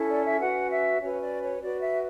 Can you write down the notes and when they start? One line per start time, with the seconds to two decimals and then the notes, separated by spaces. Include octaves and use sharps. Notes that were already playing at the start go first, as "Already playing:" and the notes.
Already playing: C#4 E4 A4
0.10 D5
0.25 E5
0.39 C#4 F#4 B4 F#5
0.71 E5
1.00 C#4 F#4 B4 C#5
1.21 D5
1.41 C#5
1.61 F#4 B4 D5
1.81 E5